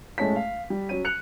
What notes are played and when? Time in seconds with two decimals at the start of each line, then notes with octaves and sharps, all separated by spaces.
0.18 A2 G#3 A3 C#4 A5 B6
0.36 F5
0.70 G3
0.89 F#3 C#4 D#7
1.05 F#6 C#7 F7